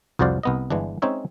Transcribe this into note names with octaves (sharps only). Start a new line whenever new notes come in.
C2 F2 F#4 C5 D5 F5
C2 B3 D#5
G1 E3 G#3 D4
G#3 C4 C#4 D#4 C#5 E5